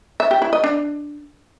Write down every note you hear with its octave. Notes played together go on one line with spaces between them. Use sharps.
E5
G4
E4
D#5
D4